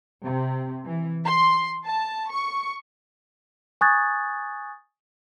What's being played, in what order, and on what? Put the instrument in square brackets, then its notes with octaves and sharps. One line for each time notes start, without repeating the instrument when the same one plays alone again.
[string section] C3
E3
C6
A5
C#6
[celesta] G#5 C#6 D#6 F#6 G#6 A6